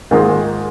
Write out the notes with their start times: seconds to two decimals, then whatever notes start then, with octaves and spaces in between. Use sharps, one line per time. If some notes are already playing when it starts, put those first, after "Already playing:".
0.11 G#2 D#3 A#3 F4 G#4